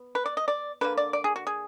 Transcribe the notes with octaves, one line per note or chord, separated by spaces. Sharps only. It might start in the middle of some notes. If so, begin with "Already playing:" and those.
Already playing: B3
B4
D5
D#5
D5
D3 F3 A#3 B4
D5
D5
G#4
F#4
G#4